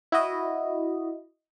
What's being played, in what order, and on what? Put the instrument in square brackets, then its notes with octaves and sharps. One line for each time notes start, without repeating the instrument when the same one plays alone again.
[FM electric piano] E4 F#4 D#5